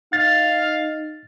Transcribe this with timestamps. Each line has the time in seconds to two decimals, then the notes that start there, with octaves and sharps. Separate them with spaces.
0.13 D#4 F5 A6